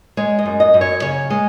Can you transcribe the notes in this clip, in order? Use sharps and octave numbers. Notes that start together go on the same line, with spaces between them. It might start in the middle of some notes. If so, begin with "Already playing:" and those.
G#3 C#5
D#5
F#2
D#5
F#2
C#5
C#3 C#5
G#3